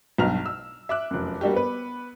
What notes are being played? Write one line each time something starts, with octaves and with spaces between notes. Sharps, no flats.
B1 G2 B2 A#5 F6 F7
E6
E5 D6 F#6
F1 F#2
G3 A#3 D4 F#4 G4
B3 B4